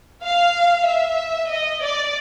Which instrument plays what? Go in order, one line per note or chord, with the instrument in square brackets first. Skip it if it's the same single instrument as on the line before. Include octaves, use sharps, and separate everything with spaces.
[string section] F5
E5
D#5
D5